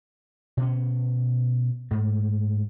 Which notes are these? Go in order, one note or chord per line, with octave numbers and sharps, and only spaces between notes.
B2 C#4
G#2 A3